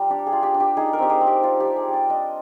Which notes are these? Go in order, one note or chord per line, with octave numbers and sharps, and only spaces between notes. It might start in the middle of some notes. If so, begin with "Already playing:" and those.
Already playing: G3 F4 A#4
D4 G4
G#4
F4
G4
D4
G4
D#4 G#4
A#4
C4 G4
G#4
C4
G4
G3 F4
G3 G4
G#4
G3
D5
D4 D#5